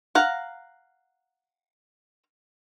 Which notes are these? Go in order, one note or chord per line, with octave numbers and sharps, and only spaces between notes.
F5 F#5 A#5